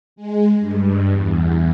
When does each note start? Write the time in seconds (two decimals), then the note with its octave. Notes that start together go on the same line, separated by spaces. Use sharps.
0.16 G#3
0.59 G2
1.10 E2